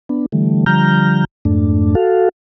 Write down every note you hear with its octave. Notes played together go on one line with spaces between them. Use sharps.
B3 D4
D3 E3 G3 A3
D3 F3 G3 A#5 F6 G6
F2 G#2 A3 D4
F#4 A4 F5